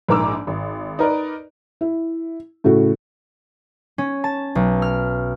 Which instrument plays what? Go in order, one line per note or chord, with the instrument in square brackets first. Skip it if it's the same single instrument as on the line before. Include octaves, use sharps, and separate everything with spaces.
[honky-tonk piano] A#1 G#2 A#4 A#5 D6 E6
G#1
D#4 A#4 B4 D5
[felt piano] E4
A2 C#3 F#4
[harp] C#4
A5
B1
F6